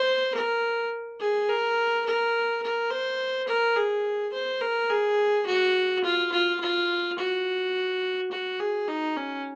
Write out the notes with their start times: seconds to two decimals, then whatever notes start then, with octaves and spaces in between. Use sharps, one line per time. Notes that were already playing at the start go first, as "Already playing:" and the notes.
Already playing: C5
0.35 A#4
1.20 G#4
1.49 A#4
2.06 A#4
2.62 A#4
2.90 C5
3.47 A#4
3.76 G#4
4.33 C5
4.61 A#4
4.90 G#4
5.46 F#4
6.04 F4
6.32 F4
6.60 F4
7.18 F#4
8.31 F#4
8.60 G#4
8.88 D#4
9.16 C#4